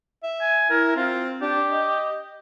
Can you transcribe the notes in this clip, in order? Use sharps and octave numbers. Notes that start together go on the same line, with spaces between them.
E5
G#5
E4 A#4
C4 F4
D4 G4
D#5